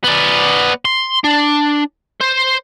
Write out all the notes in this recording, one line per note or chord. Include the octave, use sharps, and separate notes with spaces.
B3 D5
C6
D4
C5